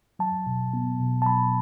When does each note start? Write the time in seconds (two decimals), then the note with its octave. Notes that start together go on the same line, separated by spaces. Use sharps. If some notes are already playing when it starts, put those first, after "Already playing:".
0.19 F#3 A5
0.46 B2
0.73 B3
1.00 B2
1.22 A5
1.26 F#3 B5